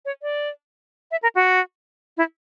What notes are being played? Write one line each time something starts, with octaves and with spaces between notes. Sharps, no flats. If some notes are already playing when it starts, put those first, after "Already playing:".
C#5
D5
E5
A#4
F#4
E4